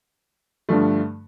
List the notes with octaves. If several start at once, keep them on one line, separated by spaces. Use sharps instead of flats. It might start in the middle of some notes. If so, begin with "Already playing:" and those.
G2 D3 F3 A3